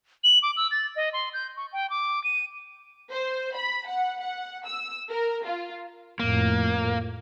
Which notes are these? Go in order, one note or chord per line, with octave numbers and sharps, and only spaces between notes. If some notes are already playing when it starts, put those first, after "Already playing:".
F#7
D6
E6
A6
D#5
C6
G6
C#6
G5
D6
D#7
C5
B5
F#5
F#5
E6
A#4
F4
F2 A2 A#3